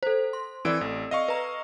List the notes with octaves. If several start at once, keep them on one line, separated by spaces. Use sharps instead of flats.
A4 C5
C6
E3 C4 A4 D5 E6 D7
A1
D#5 F5 C#6
B4 A#5